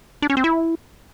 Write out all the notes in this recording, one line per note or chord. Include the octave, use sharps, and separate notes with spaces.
D4
C#4
C4
E4